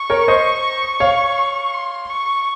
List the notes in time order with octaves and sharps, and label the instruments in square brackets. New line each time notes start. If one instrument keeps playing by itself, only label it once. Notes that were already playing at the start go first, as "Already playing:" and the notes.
Already playing: [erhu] C#6
[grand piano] A#4 C#5
C5 D#5
C#5 F5
[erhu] C6
C#6